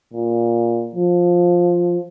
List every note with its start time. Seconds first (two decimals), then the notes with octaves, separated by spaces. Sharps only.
0.14 A#2
0.95 F3